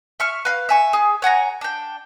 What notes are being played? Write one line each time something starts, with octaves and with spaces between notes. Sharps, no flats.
E5 C#6 F6
B4 F5
E5 G#5 C#6
G#4
C#5 F#5 G#5 A#5
D4 G5